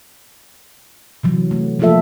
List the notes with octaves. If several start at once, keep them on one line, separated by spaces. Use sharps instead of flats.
C3 E3 F#3
A3
F3 A3 A#3 F4 A4 E5